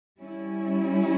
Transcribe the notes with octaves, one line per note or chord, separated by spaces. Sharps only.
G3 C#4 E4